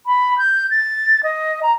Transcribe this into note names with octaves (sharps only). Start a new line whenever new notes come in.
B5
G6
A6
D#5
A#5